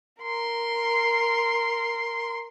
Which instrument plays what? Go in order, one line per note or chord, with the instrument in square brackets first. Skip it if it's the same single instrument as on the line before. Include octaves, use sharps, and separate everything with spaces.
[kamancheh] A#4 C6